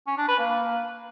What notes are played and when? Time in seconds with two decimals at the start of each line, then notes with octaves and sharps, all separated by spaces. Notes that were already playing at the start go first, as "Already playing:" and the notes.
0.07 C#4
0.18 D4
0.28 B4
0.39 A#3